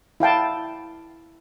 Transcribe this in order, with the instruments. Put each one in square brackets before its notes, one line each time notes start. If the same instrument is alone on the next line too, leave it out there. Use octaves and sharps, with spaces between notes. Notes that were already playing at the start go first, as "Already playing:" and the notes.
[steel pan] E4 F5 G5 A5